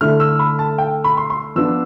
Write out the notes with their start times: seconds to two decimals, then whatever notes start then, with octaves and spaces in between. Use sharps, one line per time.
0.01 D3 A3 E4 F6
0.20 E6
0.39 B5
0.59 A5
0.78 G5
1.04 B5
1.17 C6
1.30 C6
1.56 F3 B3 D4 E6